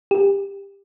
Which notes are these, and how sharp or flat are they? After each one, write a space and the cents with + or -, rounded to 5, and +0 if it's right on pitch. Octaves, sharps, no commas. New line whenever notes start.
G4 +20